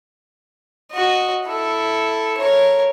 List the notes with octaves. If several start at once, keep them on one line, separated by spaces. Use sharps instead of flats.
F#4 D#5
E4 A4
A#4 C#5